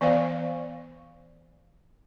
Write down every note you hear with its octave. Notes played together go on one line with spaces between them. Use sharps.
E3 B3 C5 D5 F5